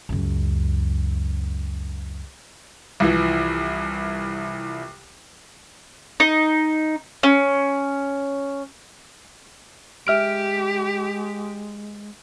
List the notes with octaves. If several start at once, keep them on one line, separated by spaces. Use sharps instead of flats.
C#2 F#2
C2 E3 F3
D#4
C#4
G#3 G4 E5 F6 D7